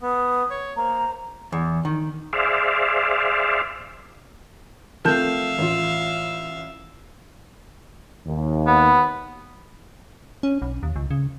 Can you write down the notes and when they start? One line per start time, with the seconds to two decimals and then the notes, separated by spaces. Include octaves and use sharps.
0.01 B3 D#6
0.50 C#5
0.77 A#3 C5 A#5
1.52 E2
1.85 D#3
2.33 G#4 C5 D5 E5 F5
5.05 F3 A3 C4 A#4 E5 F5 A5 G6
5.58 A1 F4
8.26 D#2
8.67 B3
10.43 C#4
10.62 B1
10.83 D#2
10.96 C#2
11.11 C#3